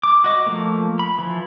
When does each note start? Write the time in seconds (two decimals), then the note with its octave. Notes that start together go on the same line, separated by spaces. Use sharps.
0.03 D6
0.24 F#4 D#5 D6
0.46 F3 A3 A#3
0.99 B5
1.18 E3 F3